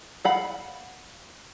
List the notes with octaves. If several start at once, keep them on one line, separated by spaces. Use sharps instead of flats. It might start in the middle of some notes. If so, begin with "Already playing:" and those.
F5 F#5 B5